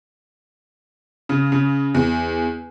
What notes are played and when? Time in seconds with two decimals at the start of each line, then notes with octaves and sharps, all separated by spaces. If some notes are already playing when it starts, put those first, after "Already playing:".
1.29 C#3
1.52 C#3
1.95 E2